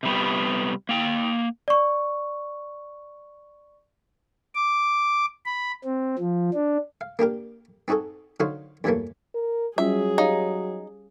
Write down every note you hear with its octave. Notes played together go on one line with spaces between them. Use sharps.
C3 G3 B3
A#3 G5
D5 C#6
D6
B5
C4
F3
D4
F5
A#3 D4 G4 A#4
C4 D#4 F#4 G#4 A4
D3 F#3 D#4 F#4 C5 F5
E2 G2 E3 F#3 A3 A#3
A#4
F#3 G3 C#4 F4 G#4 E5
D#4 G4 C#5 F5